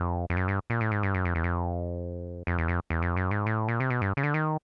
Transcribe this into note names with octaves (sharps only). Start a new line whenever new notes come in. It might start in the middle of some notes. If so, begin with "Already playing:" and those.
Already playing: F2
F2
F#2
G2
A#2
A2
G#2
G2
F#2
F2
E2
F2
F2
E2
F2
E2
F2
F#2
G#2
A2
A#2
C3
B2
G2
C#3
D3
D#3